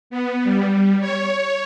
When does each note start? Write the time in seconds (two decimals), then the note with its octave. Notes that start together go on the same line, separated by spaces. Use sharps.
0.10 B3
0.44 G3
1.00 C#5